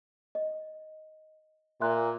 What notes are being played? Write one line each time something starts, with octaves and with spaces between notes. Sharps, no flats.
D#5
A#2 E5 C6 F#6